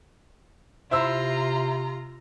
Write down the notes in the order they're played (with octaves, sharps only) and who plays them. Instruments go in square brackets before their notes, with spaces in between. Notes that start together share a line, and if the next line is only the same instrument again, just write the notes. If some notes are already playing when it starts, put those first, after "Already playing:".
[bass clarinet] C3 [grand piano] E4 C5 E6 [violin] F4 A#5